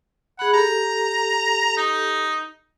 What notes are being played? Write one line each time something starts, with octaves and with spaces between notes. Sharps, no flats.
G#4 F#5 B5
G4 A4 A#5
D#4